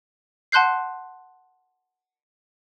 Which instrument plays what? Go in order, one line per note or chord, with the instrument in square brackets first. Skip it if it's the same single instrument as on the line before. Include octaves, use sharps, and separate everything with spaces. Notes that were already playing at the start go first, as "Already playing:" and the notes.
[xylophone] F#5 A5 C6 F#6 G6 C7